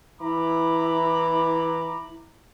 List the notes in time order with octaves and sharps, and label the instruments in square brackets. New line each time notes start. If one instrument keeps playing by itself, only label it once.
[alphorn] E3 [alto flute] E4 [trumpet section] A#5 B5 D6